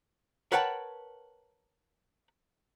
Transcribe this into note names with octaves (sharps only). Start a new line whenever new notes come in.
A#4 B4 C#5 F#5 G5 A5